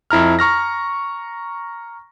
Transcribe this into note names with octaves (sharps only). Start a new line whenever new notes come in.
F2 E4 A#5 F6
A#5 C#6 F6 A#6